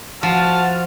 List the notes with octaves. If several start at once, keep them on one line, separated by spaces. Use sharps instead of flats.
F3 F#4 F#5 A5 F6